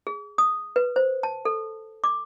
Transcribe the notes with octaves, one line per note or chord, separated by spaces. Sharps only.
G#4
D#6
B4
C5
A5
A4
D6